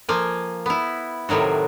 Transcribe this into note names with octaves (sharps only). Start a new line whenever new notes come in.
F3 A#3 G#5
B3 E4
A2 C3 D#3 F#3 F#4